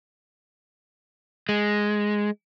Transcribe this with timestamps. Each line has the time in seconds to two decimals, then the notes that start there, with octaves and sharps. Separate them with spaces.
1.49 G#3